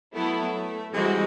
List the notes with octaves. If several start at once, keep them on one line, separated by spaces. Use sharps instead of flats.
F#3 A3 B3 E4 A4
E3 G3 G#3 C4 D#4 F#4